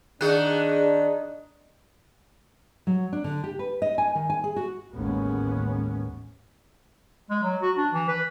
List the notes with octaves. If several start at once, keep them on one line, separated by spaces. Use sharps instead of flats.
D#3 D4 G#4 F#6
F#3
D4
D3
G4
B4
D#5
G#5
D#3
G#5
G#4
F#4
A1 D#2 G#3 B3 C#4
G#3
F#3
F#4
D4
E3
B4